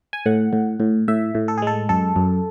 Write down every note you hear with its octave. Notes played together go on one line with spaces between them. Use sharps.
G#5
A2 F#5
A2
A2
A2 E5
A2
A4
G#4
G#3 A4
F#2 A4
F#2